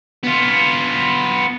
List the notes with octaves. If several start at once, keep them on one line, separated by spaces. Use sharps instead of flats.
B3 F4